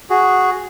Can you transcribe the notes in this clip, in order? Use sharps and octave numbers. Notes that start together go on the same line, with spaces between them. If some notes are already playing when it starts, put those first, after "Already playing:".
F#4 G#4